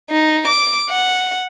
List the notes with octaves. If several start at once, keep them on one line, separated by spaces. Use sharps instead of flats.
D#4
D6
F#5